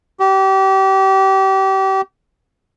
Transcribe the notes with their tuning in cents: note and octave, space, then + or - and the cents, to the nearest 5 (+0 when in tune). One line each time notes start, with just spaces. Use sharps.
G4 -30